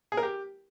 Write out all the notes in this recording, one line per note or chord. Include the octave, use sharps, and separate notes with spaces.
G#4
A#4
G4